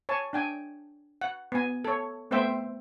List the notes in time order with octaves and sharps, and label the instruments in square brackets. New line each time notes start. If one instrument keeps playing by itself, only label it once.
[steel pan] C#5 G#5 A5
D4 G5 G#5
F#5
B3 G#5
A4 C#5
A3 B3 C4 C5 E5 G5